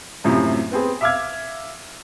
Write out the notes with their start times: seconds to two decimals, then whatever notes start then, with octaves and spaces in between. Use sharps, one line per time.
0.24 F#2 A2 C3 F3
0.71 B3 C4 G#4
1.01 E5 F5 D6 E6 F6 G#6